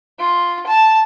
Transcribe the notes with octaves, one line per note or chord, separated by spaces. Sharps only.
F4
A5